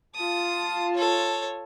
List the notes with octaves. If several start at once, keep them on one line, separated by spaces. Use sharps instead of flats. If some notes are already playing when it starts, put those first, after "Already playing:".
F4 A5 D#6
A4 C#5